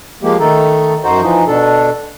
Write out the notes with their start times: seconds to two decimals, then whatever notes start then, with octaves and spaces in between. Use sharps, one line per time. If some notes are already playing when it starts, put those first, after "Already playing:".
0.23 F3 G#3 A#3 G4
0.40 D#3 A3 D#4 A4
1.04 F#2 D#4 F#4 C5
1.22 E3 F3 D#4
1.48 B2 D4 A4